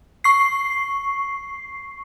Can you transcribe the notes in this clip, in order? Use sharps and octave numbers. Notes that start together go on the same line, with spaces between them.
C#6 C7